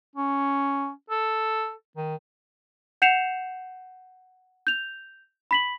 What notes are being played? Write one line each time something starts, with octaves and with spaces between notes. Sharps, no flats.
C#4
A4
D#3
F#5 G6 C7 C#7 E7 F7
G6 F7
B5 B6 F#7